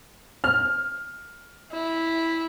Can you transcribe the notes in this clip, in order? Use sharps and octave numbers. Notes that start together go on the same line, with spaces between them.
F6
E4